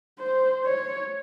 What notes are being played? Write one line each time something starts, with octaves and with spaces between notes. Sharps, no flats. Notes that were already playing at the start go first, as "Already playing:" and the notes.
C5
C#5